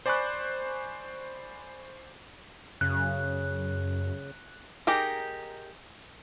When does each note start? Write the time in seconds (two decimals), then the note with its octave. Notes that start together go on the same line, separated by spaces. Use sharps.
0.06 C5 D5 G#5 B5 C#6 F#6
2.81 F#2 C#3 F#6
4.87 D#4 G4 G#4 A#4